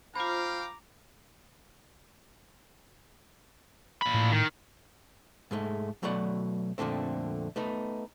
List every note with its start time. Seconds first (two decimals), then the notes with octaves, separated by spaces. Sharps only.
0.16 F4 C5 F5 G5 A#5 B5 D6
4.02 A#2 B5
4.14 A2
4.32 D#3
5.51 G#2 G#3 A3
6.03 B2 F#3 A3 D5 F#5
6.78 F2 A#2 D3 A3 C4
7.56 A3 B3 D#4